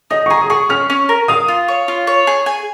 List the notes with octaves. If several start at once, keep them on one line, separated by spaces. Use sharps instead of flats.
D#4 D#5
C#6
G#4 A#5
D#6
G#4 C#6
C#4 F6
C#4
A#4
F5 D#6
F4
C#5
F4
C#5
G#4
G#5